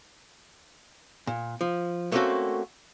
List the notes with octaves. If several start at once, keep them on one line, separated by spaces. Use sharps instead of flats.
A#2
F3
A3 A#3 C4 C#4 F#4 A4